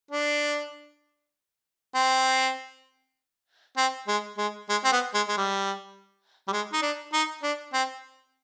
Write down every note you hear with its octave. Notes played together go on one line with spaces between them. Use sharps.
D4
C4
C4
G#3
G#3
G#3
C4
B3
G#3
G#3
G3
G3
G#3
D#4
D4
D#4
D4
C4